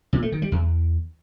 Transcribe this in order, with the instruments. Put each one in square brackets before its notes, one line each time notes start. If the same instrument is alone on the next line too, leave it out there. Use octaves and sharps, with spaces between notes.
[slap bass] A#2
A3
D#3
G3
E2